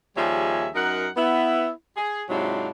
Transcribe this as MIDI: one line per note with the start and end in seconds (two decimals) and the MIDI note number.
0.17 0.69 39
0.17 0.69 53
0.17 0.69 55
0.17 0.69 68
0.17 0.69 73
0.17 0.69 76
0.75 1.08 42
0.75 1.08 63
0.75 1.08 70
0.75 1.08 78
1.17 1.70 59
1.17 1.70 64
1.97 2.24 68
2.29 2.70 44
2.29 2.70 48
2.29 2.70 54
2.29 2.70 62
2.29 2.70 64
2.29 2.70 65